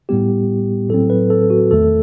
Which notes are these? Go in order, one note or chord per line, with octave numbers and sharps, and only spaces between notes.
A2 G3 B3 G4
A2 F#3 C4 A4
B4
A4
F#4
E2 D#3 A3 A4